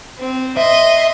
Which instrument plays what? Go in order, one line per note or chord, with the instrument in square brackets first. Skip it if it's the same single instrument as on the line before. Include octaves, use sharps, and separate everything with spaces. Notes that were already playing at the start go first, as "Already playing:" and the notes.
[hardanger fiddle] C4
[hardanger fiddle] D#5 C6 [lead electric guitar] E5